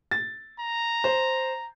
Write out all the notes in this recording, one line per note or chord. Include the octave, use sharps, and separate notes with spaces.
A6
A#5
C5